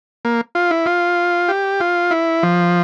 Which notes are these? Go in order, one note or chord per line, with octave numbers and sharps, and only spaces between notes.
A#3
F4
E4
F4
G4
F4
E4
F3